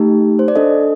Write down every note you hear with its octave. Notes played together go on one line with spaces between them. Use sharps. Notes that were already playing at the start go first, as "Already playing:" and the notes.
Already playing: A3 D#4 G4
C5
D5
D4 A4 D#5